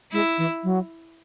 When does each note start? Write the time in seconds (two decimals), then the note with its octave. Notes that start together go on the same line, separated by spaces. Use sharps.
0.12 G#3 E4
0.38 E3
0.63 F#3